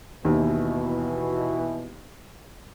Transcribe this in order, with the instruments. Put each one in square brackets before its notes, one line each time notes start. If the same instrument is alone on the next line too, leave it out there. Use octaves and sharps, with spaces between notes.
[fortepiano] D#2 [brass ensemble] B2 E3